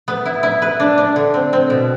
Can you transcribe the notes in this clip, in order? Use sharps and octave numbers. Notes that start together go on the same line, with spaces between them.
B3
E4
E4
B4
D4
D4
D3
C4
C4
B2